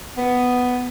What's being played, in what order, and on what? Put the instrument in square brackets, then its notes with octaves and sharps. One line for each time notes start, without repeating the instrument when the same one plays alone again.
[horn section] B3